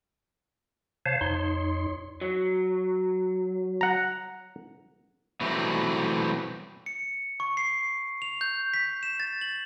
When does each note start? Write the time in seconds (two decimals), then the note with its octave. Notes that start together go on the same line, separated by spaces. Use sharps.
1.06 C3 C5 C#5 F5 A5
1.21 F2 D#4 C#5 C6
2.21 F#3
3.81 F#5 A#5
5.41 B2 E3 F#3 G3 A3 C4
6.86 C#7
7.40 C#6
7.57 C7
8.22 F7
8.41 G6
8.74 B6
9.03 E7
9.20 A6
9.41 F#7